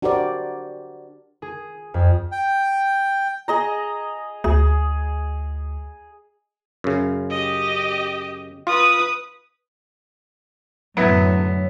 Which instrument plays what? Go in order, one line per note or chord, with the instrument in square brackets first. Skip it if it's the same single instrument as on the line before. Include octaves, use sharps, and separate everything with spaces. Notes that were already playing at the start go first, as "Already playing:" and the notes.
[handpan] D4 F#4 G4 A#4 C5 D5
[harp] G#4
F2
[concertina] G5
[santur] G#4 D#5 A#5
[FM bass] D2 [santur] G#4
[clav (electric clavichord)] F#2 C#3
[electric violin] G4 D#5
[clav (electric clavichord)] F4 [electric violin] B4 D#6
[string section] F#2 A2 D3 [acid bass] F#3 [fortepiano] B3 E4 E5